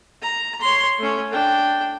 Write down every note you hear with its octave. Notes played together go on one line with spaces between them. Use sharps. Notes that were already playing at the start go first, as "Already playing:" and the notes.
A#5
C#5 C6
A3 C#4
D4 G5